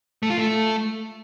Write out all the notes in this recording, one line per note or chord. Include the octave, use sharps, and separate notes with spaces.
A3
F4
A3